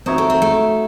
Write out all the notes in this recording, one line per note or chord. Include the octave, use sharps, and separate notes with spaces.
C4 D#4 F#4 C#5 E5
A3
C4
A3